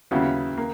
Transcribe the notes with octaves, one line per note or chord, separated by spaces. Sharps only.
D#2 C#3 F#3 B3 E4
A#3